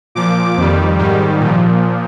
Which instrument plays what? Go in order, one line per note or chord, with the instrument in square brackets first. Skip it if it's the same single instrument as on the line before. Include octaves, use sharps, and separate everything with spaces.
[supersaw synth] A#2 F3 D6
F2 D#3 G3
G#2 D#3 G3
A#2 F3